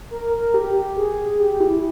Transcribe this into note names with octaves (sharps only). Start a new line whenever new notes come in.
A#4
A#4
G4
G#4
G4
E4